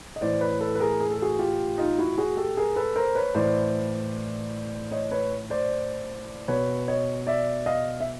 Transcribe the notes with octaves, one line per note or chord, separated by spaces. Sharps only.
D#5
A2 E3 C5 D5
B4 C#5
A4 B4
B4
G#4 A#4
G#4
A4
F#4 G#4
F4 G4
D#4 F4
E4 F#4
F#4 G#4
G4 A4
G#4 A#4
A4 B4
A#4 C5
B4 C#5
A2 E3 C5 D5
C#5 D#5
B4 C#5
C5 D5
B2 B4 C#5
C#5 D#5
D5 E5
D#5 F5
E5